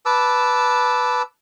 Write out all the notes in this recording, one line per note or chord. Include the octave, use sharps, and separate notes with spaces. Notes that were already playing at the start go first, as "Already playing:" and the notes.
B4 A5 D6 E6